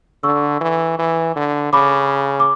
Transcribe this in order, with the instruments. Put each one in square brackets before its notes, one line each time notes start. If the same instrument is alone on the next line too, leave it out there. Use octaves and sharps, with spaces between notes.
[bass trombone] D3 [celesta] C#6 E6
[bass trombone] E3
E3
D3
[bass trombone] C#3 [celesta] B5 D6
[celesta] D6